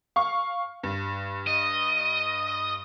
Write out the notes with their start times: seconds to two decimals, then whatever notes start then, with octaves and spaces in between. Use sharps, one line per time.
0.16 F5 C#6
0.83 G2
1.47 D#5